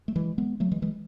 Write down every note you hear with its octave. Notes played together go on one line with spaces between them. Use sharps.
A3
E3 G#3
G#3 B3
F#3 A3
E3 G#3
E3 G#3